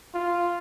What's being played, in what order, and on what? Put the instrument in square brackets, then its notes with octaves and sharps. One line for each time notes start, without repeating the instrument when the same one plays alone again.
[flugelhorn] F4